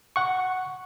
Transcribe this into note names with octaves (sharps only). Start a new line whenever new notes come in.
F#5 C#6